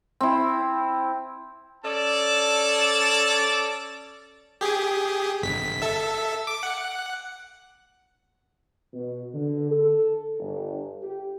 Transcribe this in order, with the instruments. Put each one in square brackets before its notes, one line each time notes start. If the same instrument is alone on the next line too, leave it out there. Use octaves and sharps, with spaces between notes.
[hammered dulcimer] C4 E4
[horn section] C#4 A4 D5 A5
[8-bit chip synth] G4 G#4
G1 B6
A4 E5
D6
F#5
[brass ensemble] B2
D3
A4
G1
G4